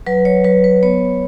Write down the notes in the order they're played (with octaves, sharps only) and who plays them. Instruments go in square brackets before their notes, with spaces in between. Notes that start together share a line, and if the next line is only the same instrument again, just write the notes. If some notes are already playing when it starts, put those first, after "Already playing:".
[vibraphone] F#3 B4
C#5
F#3 B4
B4
B3 C#5